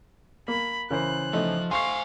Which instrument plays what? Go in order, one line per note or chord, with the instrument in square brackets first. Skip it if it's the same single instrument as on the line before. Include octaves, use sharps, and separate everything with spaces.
[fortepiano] A#3 [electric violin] B5
[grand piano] C#3 E3 C5 [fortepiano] A#4 [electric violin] F#6
[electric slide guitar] F3 [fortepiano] A3 D#4
[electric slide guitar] C5 G#5 [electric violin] F5 [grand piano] C6 C#6 C7